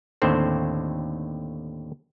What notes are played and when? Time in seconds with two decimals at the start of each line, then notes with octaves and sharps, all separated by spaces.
0.22 D#2 A2 D3 C4 C5